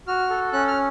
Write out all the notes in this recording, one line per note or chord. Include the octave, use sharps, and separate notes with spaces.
F#4 F6
A4
C#4 F#6
F6